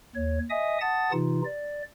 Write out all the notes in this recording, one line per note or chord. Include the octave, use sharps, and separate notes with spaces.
D#2 C#5
D#5 E5 G#5 D#6
F#5 A5 D#6 A6
C3 E3 D#4 F4
D5